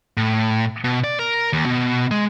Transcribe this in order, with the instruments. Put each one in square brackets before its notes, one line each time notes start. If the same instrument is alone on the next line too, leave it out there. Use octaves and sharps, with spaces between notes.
[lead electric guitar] A2
B2
D5
A#4
D#2
B2
G#3